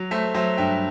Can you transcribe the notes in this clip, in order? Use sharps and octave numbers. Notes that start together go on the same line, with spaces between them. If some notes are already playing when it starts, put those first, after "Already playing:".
Already playing: F#3
A3 C5 E5
F#3 C5 E5
G2 E5 G5